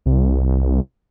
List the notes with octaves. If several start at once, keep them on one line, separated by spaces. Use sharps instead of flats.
C2